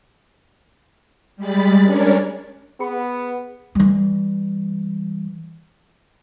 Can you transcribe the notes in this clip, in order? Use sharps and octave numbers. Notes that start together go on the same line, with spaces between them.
G3 G#3 B5 A6
C#4 D4 A#4 C#5
B3 G#4 B5 C#7
E3 G3